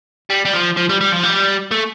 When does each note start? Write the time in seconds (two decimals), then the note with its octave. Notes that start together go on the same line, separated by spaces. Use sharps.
0.30 G3
0.45 G3
0.53 F3
0.77 F3
0.89 G3
1.01 G3
1.12 F3
1.24 G3
1.71 A3